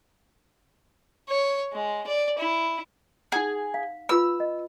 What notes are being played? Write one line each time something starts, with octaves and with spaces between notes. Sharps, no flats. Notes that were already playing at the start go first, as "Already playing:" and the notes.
C#5
G#3
D5
E4
D#4 G#4 F#5
F5
F4 B4 B5 E6
D#5